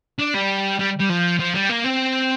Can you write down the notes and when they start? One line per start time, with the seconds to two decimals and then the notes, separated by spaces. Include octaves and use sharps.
0.19 D4
0.34 G3
0.79 G3
0.99 G3
1.09 F3
1.39 F3
1.55 G3
1.70 A#3
1.84 C4